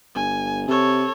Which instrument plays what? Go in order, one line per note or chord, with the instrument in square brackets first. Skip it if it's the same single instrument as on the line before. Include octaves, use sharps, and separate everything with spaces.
[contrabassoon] G1 [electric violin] G#5
[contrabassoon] C3 [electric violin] A4 C#5